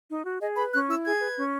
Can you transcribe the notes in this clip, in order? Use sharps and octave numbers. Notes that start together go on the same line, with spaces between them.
D#4
F#4
G#4 D#5
B4 B5
C#4 F#6
E4 E6
G#4 G#6
B4
C#4